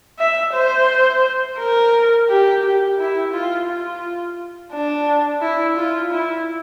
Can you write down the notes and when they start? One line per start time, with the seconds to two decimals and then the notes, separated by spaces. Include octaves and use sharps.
0.19 E5
0.54 C5
1.58 A#4
2.29 G4
2.63 G4
2.98 E4
3.33 F4
3.68 F4
4.73 D4
5.42 E4
5.77 F4
6.11 E4